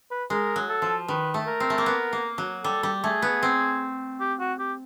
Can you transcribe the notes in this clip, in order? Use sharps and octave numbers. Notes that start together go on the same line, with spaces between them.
B4
G#3 A#4
F#3
A4
F3
D#3 B4
A3
A#4
C4
A3
A#3
B3
A#3
F#3
G3 A4
G3
A3 G#4
B3
C4
G4
F#4
G4